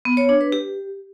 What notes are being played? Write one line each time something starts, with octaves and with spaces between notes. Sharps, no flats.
B3
C#5
D4
B4
G4